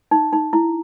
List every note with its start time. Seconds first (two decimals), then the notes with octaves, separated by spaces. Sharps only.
0.11 D#4
0.33 D#4
0.53 E4